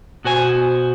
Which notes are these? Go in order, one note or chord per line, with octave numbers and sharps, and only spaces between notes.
B2 F#4 C5 G#5